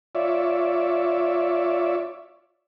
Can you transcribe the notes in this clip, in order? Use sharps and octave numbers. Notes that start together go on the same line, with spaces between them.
F4 C#5 D5 E5